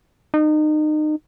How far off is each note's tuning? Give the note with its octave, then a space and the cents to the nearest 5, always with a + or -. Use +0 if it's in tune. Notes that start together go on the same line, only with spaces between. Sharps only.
D#4 -30